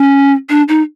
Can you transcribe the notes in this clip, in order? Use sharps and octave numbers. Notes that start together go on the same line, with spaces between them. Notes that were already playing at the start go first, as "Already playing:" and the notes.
Already playing: C#4
D4
D#4